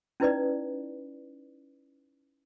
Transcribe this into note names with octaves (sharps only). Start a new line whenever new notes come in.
C#4 D#4 E4 B4 D5 D#5